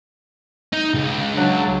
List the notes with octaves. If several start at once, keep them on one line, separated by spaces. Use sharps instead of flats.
D#4
C#2
F#3 D4